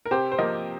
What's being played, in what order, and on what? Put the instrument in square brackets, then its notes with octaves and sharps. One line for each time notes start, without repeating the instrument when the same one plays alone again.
[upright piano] A#4
C3 G4 C5
C5
F3 A#3 A#4 D#5